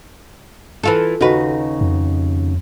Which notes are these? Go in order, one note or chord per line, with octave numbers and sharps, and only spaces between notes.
E3 F4 A4
D#2 C#3 D#4 F#4 B4
F2